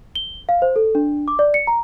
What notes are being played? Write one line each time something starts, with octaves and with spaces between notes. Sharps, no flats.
G7
F5
C5
A4
D4
D6
D5
C#7
A#5